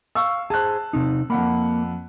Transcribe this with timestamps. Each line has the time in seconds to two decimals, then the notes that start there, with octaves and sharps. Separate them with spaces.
0.15 F5 C#6 E6
0.50 G#4 C5 A5 F#6
0.93 C3 C4 D#4
1.30 F2 A#3 F#5 B5